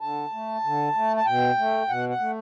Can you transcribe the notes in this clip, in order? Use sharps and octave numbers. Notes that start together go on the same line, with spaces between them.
D3 A5
A3
D3
A3
A5
B2 G5
A3
B2 F#5
F#5
A3